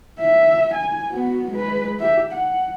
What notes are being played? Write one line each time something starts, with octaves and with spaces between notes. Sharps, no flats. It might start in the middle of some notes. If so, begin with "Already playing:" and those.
E5
G#5
B3 F#4
G#3 B4
G4 E5
F#5